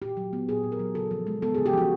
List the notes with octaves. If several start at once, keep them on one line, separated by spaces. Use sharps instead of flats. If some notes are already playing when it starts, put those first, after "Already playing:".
A#2 G4
F#3
B3
A#2 G#4
A#2
A#4
F#3
C#3 A4
F3
G#3
B3 A4
C#3 G#4
G4
F3 F#4